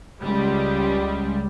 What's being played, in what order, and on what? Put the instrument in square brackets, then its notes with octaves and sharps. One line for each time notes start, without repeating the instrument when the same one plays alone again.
[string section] C#2 G3